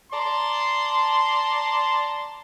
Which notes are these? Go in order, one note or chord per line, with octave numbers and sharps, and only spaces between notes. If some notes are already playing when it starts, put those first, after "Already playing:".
D5 A5 A#5 C6